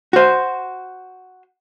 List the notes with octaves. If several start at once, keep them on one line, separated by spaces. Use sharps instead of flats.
F#4 C5